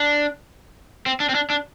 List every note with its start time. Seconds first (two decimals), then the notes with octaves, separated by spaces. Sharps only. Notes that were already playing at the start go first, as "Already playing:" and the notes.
Already playing: D4
1.06 C4
1.20 D4
1.29 C4
1.35 D4
1.50 D4